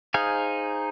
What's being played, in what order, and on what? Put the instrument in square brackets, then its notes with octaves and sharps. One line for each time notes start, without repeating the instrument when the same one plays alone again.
[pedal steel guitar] D#4 G#4 C5 F5 G#5